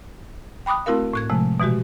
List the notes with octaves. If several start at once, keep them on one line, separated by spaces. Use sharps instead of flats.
G5 B5 D6 D#6 F#6
A3 C4 E4 F#4 A#4 F5
A2 F#6 G#6
C3 F3 G#3 A3
B2 E3 G#3 F#4 G4